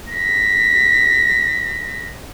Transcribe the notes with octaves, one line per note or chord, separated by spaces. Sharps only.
A#6 B6